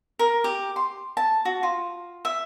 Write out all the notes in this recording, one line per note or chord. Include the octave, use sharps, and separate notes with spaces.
A#4
G4
C6
A5
F#4
F4
E5